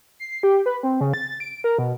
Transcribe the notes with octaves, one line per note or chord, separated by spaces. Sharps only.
C7
G4
B4
C4
C#3
A6
D7
A#4
B2